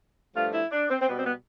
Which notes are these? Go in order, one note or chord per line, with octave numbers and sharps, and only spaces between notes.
G2 F3 A3 F4
E4
D4
C4
C4
B2 G3 B3
C4
B3